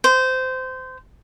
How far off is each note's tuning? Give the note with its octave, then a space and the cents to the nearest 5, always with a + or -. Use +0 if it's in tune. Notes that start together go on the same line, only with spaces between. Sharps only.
C5 -20